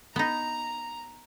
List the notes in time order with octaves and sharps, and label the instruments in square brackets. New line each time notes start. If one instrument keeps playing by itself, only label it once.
[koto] B3 D#4 [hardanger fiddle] A#5